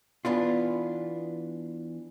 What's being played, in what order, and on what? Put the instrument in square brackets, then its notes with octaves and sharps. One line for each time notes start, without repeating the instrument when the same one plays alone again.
[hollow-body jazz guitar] E3 B3 D4 F4